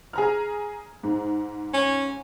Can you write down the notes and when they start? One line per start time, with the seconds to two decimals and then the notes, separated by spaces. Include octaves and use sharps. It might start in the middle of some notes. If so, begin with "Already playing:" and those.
0.13 G#4 A#5 F6
1.03 G#2
1.74 C#4